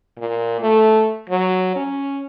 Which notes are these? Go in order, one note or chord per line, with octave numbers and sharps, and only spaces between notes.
A#2
A3
F#3
C#4